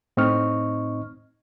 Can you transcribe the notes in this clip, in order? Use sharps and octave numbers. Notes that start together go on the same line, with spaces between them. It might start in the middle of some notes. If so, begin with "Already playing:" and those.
A2 C4 D#4 D#5 C#6 F6